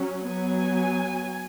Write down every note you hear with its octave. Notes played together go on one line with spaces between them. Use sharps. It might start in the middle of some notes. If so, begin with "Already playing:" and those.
Already playing: F#3 C#4
F#3 B3 G#5